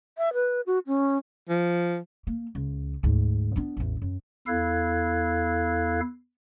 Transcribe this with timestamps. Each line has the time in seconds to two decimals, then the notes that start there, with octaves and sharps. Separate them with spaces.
0.18 E5
0.33 B4
0.66 F#4
0.87 C#4
1.49 F3
2.27 A#3
2.55 C#2
3.03 D2 G#2
3.56 B3 D4
3.77 A1 E2
4.02 F#2
4.47 E2 E4 A4 F5 F#6 G#6